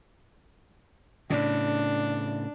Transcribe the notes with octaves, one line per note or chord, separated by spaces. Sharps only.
A2 C#3 D4